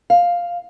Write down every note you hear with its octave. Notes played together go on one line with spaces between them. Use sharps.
F5